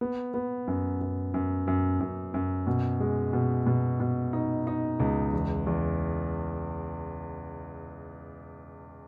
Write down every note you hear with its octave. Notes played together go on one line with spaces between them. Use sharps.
B3
B3
F#2
F#2
F#2
F#2
F#2
F#2
B2
G#3
B2
B2
B2
D#4
D#4
C#2
E2
E2